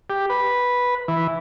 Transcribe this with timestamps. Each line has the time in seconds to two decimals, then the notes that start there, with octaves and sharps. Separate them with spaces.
0.10 G4
0.30 B4
1.08 E3